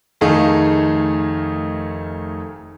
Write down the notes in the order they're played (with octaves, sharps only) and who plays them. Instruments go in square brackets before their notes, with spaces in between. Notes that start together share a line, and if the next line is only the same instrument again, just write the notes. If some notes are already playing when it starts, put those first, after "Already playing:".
[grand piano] F1 D#3 A3 D#4 G#4 F5